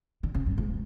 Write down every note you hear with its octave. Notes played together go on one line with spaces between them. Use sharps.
D3
C#3
F#2
G#2